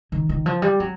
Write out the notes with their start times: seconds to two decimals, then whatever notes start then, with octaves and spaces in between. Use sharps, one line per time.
0.12 D#3
0.29 D#3
0.46 F3
0.62 G3
0.80 F#3